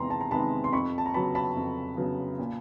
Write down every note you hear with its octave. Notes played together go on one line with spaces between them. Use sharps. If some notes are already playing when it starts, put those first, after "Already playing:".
Already playing: E2 C3 D#3 G#3 B3 A#5 C6
A5
A#5
C3 D#3 G#3 B3 A5 B5
C6
F2 B5 C#6
A5
A#5
C#3 F#3 B3 A5 B5
A5 B5
F2
C#3 F#3 B3
A#2